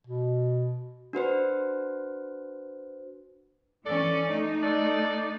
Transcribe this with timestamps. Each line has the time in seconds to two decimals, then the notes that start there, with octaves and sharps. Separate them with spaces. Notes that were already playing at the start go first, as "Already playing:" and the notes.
0.07 B2
1.13 D4 F#4 B4 C5
3.85 E3 C#4 A4 D5
4.30 A3 D#4
4.62 D4 A4 D5